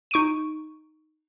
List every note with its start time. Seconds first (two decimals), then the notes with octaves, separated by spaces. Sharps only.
0.11 D#4 C#6 D7 D#7